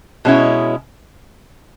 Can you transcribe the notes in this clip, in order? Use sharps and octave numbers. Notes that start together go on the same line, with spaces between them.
B2 G#3 C#4 E4